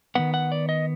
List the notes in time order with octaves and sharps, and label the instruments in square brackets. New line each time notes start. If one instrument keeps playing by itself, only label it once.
[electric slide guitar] D#3 G#3 B3 F#5
F#5
D5
D#5